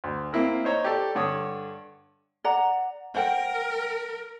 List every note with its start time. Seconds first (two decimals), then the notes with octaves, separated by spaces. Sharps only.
0.04 D2
0.33 A#3 C4 E4 A#4
0.64 D#4 C5 C#5 A#5
0.84 G4 A4 D5
1.15 G2 D3 C#5 D#6
2.44 D5 F#5 A#5
3.15 A#4 C5 F#5 G5